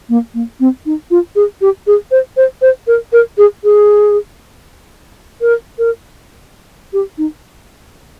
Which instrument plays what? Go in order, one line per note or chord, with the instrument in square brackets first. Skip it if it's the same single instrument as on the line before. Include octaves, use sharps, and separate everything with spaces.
[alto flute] A#3
A#3
C4
D#4
F4
G#4
G4
G#4
C5
C5
C5
A#4
A#4
G#4
G#4
A#4
A#4
G4
D#4